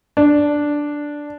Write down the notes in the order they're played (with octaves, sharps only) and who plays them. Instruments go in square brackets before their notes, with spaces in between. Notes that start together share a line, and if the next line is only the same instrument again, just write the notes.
[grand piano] D4